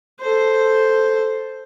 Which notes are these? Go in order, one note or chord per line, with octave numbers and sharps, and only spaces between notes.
A4 C5